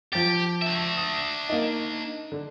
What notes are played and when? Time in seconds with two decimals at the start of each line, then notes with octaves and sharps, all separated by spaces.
0.13 F3 G4 A6
0.62 D4 E5
0.97 D#6
1.49 A#3 D#4
2.32 D3